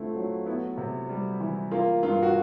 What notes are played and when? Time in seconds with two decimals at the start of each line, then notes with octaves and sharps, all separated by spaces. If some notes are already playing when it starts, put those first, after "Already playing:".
Already playing: D3 A3 C4 E4 F4
0.16 F#3
0.46 B3 E4
0.78 C3
1.09 G3
1.40 E3
1.71 A#3 F4
2.03 G2 F4
2.23 F#4